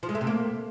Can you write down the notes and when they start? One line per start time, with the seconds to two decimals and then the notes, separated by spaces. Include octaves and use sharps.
0.03 F3
0.09 G#3
0.15 A3
0.21 C3
0.27 A#3